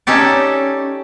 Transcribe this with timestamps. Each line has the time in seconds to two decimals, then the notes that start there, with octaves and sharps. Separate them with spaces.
0.07 C#4 D#4 G4 A4 D5